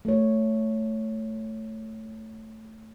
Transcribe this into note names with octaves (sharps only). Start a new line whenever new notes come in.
A3 C#5